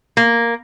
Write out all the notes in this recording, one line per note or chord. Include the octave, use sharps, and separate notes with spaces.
A#3